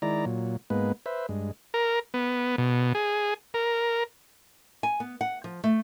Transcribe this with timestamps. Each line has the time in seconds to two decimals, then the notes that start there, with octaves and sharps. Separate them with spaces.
0.02 D#3 G#3 E4 D5 A#5
0.25 A#2 F#3
0.70 G#2 G#3 A#3 B3 B4
1.06 B4 C5 E5
1.29 G2 G#3
1.74 A#4
2.14 B3
2.58 B2
2.95 G#4
3.54 A#4
4.83 G#5
5.00 B3
5.21 F#5
5.44 F3
5.64 A3